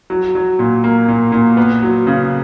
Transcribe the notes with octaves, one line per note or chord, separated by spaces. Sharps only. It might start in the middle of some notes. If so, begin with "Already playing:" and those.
F#3
F#3
A#2
A#3
A#2
A#2
B3
F#3
C#3